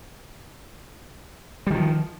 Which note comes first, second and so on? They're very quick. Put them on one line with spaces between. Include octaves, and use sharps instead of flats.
G3 D#3 F3